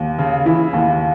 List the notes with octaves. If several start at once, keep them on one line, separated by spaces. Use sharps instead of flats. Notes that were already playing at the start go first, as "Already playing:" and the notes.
Already playing: D#2
C#3
E3 E4
D#2